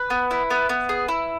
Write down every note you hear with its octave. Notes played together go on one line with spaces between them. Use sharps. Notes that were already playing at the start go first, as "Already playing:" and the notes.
Already playing: B4
B3
E4
B3
B3
G#4
E4